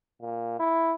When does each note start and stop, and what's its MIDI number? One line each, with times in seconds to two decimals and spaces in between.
0.21 0.58 46
0.59 0.94 64